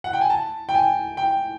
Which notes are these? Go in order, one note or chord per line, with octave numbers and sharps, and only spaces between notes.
F#5
G5
G#5
A5
G5
G#5
G5